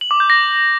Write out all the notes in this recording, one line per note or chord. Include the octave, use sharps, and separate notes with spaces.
F#7
D6
G6
A#6